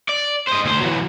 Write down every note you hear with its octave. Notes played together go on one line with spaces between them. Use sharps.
D5
C5 D#5
D2 C5
E3 F#3